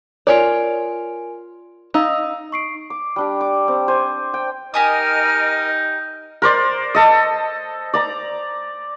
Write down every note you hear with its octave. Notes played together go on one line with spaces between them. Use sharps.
F4 A#4 C#5 D5 G#5 D7
D#4 D#5 F5 E6
C#6 C7 D7
D6
G3 D4 G4
D6
C4
C5 G#5
G5
D#4 G4 A#4 D#5 G#5 D#6 F6
A#4 C5 D5
A4 D#5
D5 A#5